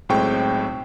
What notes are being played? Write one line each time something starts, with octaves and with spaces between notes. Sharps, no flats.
B1 A2 G#3 C4 G5 C#6